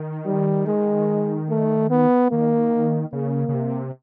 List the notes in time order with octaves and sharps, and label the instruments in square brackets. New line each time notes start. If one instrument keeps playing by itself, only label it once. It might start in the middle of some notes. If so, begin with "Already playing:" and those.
Already playing: [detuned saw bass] D#3
[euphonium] G3
G#3
A3
B3
[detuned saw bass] D#3 [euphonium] A#3
[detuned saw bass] C#3 [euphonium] A#3
[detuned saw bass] C#3
C3